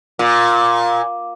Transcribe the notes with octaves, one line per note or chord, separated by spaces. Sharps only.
A#2